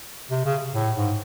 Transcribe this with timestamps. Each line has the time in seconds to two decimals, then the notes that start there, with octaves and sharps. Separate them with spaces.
0.31 C3
0.45 C#3
0.74 A2
0.96 G#2